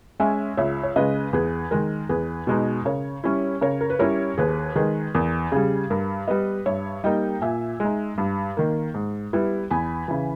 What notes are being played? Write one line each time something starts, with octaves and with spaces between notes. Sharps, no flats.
G#3 C#4 E5 G#5
C#2 C#5 E5
C#5
C#3 G#3 B4 D#5
E2 G#4 B4
D#3 G#3 A#4
E2 G#4 B4
B2 G#3 B3 D#4
C#3 A#4 C#5
G3 C#4 E4
C#3 A#4 C#5
A#4
B4
G3 C#4 E4 A#4 C#5
D#2 G#4 B4
D#3 G#3 G#4 B4
E2 A#4
C#3 G3 G#4
G2 A#4
G3 B3 B4 D#5
G2 C#5 E5
G3 A#3 D#4 D#5 G5
A#2 E5 G#5
G#3
D#4
G2
D#3 A#3
G#2
G3 B3 E4
E2 G#5 B5
C#3 E3